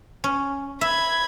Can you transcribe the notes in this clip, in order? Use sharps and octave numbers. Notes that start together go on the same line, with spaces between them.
C#4
E5 B5 G#6